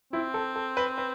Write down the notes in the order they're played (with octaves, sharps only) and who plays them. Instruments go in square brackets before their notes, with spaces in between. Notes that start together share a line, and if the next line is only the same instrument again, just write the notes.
[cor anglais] C4 [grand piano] E4
[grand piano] A4
A4
B4
B4